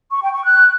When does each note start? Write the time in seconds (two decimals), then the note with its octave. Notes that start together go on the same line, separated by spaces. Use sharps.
0.11 C#6
0.22 G5
0.33 C#6
0.44 F#6